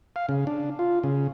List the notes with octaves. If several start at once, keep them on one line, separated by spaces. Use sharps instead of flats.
F5
C#3
D4
F4
C#3